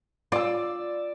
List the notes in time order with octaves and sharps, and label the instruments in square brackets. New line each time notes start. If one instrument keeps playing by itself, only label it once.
[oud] F4 [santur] D5 E6